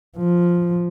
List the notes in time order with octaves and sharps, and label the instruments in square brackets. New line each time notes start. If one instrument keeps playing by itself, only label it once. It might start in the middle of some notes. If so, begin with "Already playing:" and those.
[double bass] F3